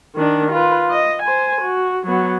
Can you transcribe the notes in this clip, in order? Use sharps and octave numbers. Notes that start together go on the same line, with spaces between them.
D#3 D4
F4 B4
D#5
C5 G#5
F#4
F#3 B3